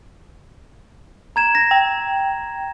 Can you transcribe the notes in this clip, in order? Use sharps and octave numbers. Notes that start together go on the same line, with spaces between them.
A#5 G#6 E7
A#6
G5